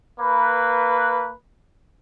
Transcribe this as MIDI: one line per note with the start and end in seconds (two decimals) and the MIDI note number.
0.20 1.31 58
0.20 1.31 71